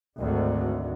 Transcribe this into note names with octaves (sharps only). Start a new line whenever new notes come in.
G#1 D2